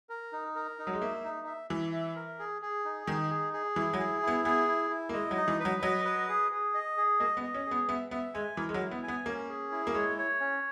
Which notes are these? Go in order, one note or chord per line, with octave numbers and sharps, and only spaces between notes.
A#4
D#4
A#4
D#4
F#3
G#3
A#3 E5
D#4
E5
E3 E5
E5
A#4
G#4
G#4
D#4
D#3 D#4
G#4
G#4
E3 E4
F#3
G#4
E4
B3
B3 G#4
E4
E4
A#3
G#3 D#5
F#3
D#4
E3
B4
F#3
F#3 D#5
B4
G#4
G#4
D#5
G#4
A#3 D#5
B3
D#5
C#4
G#4
B3
B3 E5
B3 E5
G#3 G#5
E3 A#4
G#3
F#3
E4
B3
G#5
B3
A#3 C#4
G#4
E4
A#3
G#3 C#5
C#5
C#4